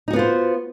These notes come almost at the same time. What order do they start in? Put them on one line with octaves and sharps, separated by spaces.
D#4 F#4 B3 F4 C5